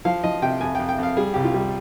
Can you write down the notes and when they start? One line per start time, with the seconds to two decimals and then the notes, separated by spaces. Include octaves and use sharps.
0.05 F3 F5
0.24 F3 D#5
0.42 C3 G5
0.61 F2 G#5
0.75 F2 G5
0.89 G5
0.98 F2 F5
1.17 G3 G#4
1.34 C2 G4
1.45 F4
1.54 G3